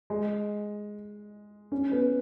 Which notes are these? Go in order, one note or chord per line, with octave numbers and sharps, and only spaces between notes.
G#3
C#4
B3